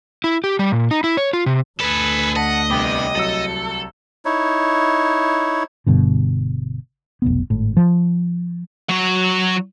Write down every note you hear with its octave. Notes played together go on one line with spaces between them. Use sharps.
E4
G4
G3
A#2
D#4
E4
C#5
F4
C3
D2 G#4 A4 B4
D#5 F#5 A5 B6
C2 B3 D4 G5 D6
C2 F#3 A4 E6
D#4 E4 C#5
G1 G2 B2 D3
F1 B1 B3
G#1 A2
F3
F#3 C#5